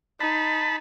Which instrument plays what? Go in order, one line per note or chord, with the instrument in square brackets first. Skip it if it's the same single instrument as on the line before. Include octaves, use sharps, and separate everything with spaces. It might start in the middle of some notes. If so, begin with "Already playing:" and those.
[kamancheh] D#4 [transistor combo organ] A5 B5